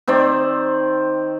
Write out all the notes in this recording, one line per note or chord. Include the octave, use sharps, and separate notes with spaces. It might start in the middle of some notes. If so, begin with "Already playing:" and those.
D#3 C4 C5 D5